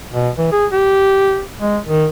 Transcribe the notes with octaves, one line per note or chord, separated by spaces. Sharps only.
B2
E3
G#4
G4
G#3
D#3